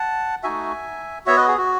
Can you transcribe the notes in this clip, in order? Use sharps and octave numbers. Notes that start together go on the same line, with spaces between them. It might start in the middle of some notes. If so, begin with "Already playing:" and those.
Already playing: F#5 A5
A3 D#4 F#4 E5 G#5
B3 F#4 C#5 E5
B4 D#5
G#4
F#4